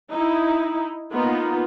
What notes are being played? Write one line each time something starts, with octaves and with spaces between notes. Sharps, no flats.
D#4 E4
A#3 B3 D#4 F4